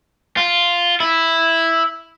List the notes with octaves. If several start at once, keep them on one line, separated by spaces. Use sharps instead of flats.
F4
E4